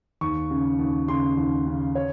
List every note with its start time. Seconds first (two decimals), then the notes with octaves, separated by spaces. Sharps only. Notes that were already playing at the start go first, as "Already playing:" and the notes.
0.21 D#2 C#6
0.51 C#3
0.79 D#2
1.08 C#3 C6
1.37 D#2
1.67 C#3
1.95 C#5